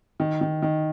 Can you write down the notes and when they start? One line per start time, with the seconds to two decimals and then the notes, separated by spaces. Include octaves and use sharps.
0.20 D#3
0.41 D#3
0.62 D#3